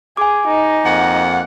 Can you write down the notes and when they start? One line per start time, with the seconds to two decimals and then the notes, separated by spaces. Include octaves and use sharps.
0.17 G#4 G#5 D6
0.47 D#4
0.85 F2 A#3 F#5